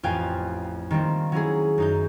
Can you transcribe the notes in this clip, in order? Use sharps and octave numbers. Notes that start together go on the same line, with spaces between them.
A1 F2 F4 F5 G5 G#5
D#3 G3 A#3 C4
F#3 C#4 E4 G#4
F#2 D#4 G6